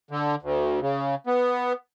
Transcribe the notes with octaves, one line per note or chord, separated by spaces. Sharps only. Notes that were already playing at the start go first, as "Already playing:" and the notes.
D3
D2
C#3
B3